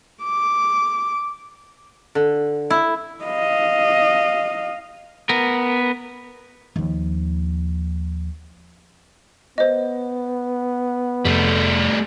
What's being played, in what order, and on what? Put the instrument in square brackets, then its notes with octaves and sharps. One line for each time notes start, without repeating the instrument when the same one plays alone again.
[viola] D6
[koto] D3
E4
[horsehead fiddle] D#5 F5
[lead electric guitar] B3 A#4
[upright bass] D#2 F3
[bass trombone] B3 [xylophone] C5 D#5
[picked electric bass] F1 [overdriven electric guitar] G3 A3